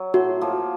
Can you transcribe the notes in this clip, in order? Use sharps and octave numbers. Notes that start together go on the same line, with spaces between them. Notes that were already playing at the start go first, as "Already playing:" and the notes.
Already playing: F#3
A2 F#4
F3 A#3